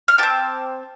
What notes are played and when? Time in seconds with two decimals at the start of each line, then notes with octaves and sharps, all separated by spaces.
0.08 F6
0.18 C4 G4 A5 D6